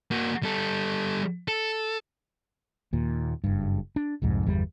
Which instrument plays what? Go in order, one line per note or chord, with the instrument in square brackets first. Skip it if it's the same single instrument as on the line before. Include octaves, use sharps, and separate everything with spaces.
[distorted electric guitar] A#3 F#4
G3 A4
A4
[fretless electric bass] D#2 A#2
F#1 G2
D4
C2 F2 G#2
G1 E2 G3